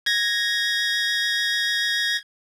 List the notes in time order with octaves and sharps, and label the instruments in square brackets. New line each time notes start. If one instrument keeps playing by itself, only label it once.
[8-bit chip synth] G#6 A#6